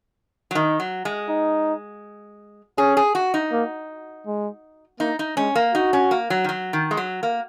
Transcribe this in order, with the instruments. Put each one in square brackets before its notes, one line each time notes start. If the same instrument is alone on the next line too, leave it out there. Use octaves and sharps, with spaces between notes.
[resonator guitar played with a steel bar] F#3
[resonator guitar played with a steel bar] D#3 [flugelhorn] D#4
[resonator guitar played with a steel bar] F#3
G#3
[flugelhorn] D#4
[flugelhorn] C#4 [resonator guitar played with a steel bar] G#4
[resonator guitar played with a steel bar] G#4
F#4
D#4
[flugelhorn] A#3
G#3
[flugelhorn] A#3 [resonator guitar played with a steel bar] D#4
[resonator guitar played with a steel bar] D#4
[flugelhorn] G#3 [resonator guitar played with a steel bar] C#4
[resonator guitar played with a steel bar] A#3
[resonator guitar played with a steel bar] D#4 [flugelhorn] F#4
[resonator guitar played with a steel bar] C#4
A#3
F#3
D#3
F#3
D#3
G#3
F#3
A#3